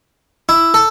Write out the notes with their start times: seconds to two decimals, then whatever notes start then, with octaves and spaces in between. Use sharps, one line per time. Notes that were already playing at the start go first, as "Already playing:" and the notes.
0.49 E4
0.74 A4